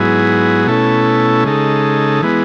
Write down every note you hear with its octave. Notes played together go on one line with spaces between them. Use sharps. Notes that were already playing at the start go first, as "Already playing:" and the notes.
Already playing: G#2 F#3 B3 E4 G#4
B2 A3 C#4 E4 A4
C#3 G#3 D#4 A4
E3 G#3 B3